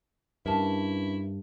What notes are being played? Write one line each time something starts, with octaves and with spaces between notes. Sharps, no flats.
G2 C#4 D4 E4 A#4 B4 A5